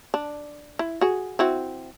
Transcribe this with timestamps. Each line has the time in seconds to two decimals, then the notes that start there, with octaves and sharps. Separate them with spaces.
0.14 D4
0.79 E4
1.01 F#4 G#4
1.39 C4 E4 F#4